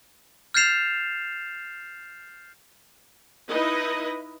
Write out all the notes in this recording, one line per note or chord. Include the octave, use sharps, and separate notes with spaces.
F6 G6 A6 C7 E7 F7
D#4 E4 B4 D#5